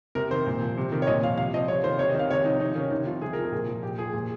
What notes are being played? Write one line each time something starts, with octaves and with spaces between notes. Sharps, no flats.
C3 A#4
D#3 C5
A#2
F3
C3
D#3
C#5
A#2 D#5
F3 F5
C3 F5
F3 D#5
C3 C#5
D#3 C5
C3 C#5
D#5
D#3 F5
C3 C#5
F3 D#4
C3 D#4
D#3 C#4
C3 D#4
F3 F4
C3 G#4
F3 A#4
G#4
A#2
F3
A#2 G4
F3 G#4
A#2